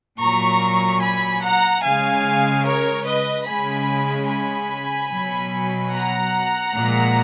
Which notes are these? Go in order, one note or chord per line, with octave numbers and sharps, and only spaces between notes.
A#2 F#3 A#5 C#6
G#5 B5
F#5 A#5
C#3 G#3 F5 G#5
A#4 C#5
B4 D#5
C#3 G#3 G#5 B5
G#5 B5
B2 F#3
F#5 A#5
A#2 F3 G#3